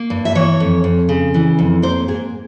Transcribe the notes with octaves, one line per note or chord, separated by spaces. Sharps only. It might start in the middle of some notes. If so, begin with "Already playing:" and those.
Already playing: A#3
G2
E5
E3 C#5
F2
F2
C#3
E3
F2
A#3 C5
G#2 G#4